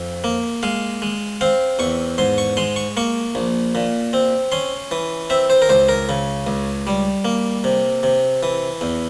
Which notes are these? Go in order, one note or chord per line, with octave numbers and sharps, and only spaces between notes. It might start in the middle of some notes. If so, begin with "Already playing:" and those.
Already playing: F2
A#3
G#3 F5
G#3
C4 F5
E2 C#6
G#2 C6
C#6
G#3 C6
C#6
A#3 C#6
A#1
A#2
C4
C#4 C6
E3
C4 E5
C5
A#4
C#2 C5
A#4
C#3
C#2
G3
A#3
C3
C3
E3
E2